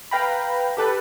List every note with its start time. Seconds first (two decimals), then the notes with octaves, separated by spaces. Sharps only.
0.11 B4 F5 G5 A#5 B5
0.77 G4 A4 B4